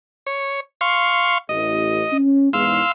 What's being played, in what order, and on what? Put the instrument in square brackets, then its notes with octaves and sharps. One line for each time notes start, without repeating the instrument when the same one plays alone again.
[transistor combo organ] C#5
F5 C6 C#6
[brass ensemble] A1 [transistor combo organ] D#5
[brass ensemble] C#4
[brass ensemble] E2 G#2 [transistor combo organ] F5 C6 E6